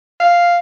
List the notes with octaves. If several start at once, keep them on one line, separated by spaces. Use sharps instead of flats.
F5